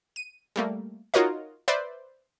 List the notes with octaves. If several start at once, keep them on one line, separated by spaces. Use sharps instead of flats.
D#7
G3 A3 A#3
D#4 F4 F#4 A#4 C#5 D#5
B4 C5 D5 E5